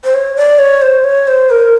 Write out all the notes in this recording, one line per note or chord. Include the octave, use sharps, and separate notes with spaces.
C5
C#5
D5
C#5
C5
C#5
C5
A#4